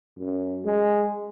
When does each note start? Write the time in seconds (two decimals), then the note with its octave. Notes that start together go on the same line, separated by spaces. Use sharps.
0.18 F#2
0.65 G#3